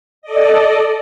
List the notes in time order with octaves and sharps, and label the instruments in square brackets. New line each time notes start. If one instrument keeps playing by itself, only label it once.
[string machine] A4 D5 D#5